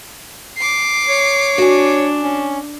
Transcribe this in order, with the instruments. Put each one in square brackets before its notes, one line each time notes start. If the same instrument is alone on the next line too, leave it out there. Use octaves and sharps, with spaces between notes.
[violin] D6 C7
[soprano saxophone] C#5
[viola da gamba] D4 [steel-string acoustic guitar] F#4 G#5
[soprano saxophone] C#4